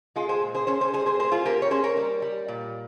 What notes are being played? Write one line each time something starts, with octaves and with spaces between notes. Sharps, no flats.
G#3 F4 G#4
G#4 C5
A#2
G#4 C5
C#4 G#4 C5
G#4 C5
G3 G#4 C5
G#4 C5
A#3 G#4 C5
F4 G#4
A#3 G4 A#4
C#5
C#4 G#4 C5
A#4 C#5
G3
G3
A#2